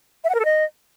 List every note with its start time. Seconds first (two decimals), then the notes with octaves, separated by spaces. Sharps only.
0.24 E5
0.29 F#5
0.35 A#4
0.40 A4
0.45 D#5